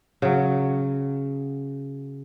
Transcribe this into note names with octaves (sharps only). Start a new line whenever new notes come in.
C#3 F#3